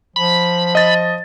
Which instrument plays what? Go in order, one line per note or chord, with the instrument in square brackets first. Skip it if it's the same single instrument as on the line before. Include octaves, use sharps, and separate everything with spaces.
[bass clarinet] F3 [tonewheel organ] B5
[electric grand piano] D#5 A6